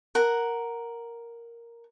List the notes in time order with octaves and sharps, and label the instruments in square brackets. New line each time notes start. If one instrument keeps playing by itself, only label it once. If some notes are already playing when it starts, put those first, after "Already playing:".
[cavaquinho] A#4 F#5